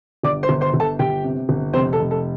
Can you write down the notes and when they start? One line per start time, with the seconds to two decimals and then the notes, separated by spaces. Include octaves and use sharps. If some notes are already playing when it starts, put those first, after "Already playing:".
0.23 G1 D5 D6
0.43 C5 C6
0.49 G1
0.61 C5 C6
0.74 G1
0.80 A4 A5
0.99 G1 G4 G5
1.24 C3
1.49 G1
1.73 F1 C4 C5
1.93 A4
1.99 F1
2.11 A4